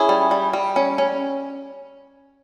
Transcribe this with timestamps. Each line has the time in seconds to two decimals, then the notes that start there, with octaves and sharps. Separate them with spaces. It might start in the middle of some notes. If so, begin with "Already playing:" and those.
Already playing: C#4 E4 G#4
0.09 G3
0.31 G3
0.53 G3
0.76 C#4
0.98 C#4